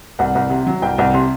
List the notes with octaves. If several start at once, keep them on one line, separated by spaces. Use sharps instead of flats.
C2 F#5
C2
C3
F#3
C2 G5
C2
C3 C6